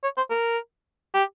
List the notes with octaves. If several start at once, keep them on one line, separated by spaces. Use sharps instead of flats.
C#5
C5
A#4
G4